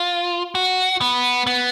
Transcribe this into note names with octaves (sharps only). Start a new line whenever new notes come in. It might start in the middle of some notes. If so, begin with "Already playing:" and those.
Already playing: F4
F#4
B3
B3